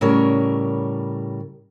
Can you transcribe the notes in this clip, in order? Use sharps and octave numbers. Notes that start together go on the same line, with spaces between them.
A2 C#3 G3 A#4 C#5